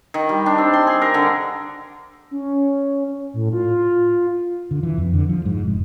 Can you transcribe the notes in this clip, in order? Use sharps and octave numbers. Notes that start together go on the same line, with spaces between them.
D#3
G3
D4
C4
C6
G#4
A#4
D3
C#4
A2
F4
D3
E3
F2
D3
F3
G#2
F1